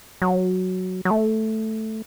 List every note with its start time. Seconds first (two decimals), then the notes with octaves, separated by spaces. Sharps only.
0.22 F#3
1.05 F#3
1.11 A3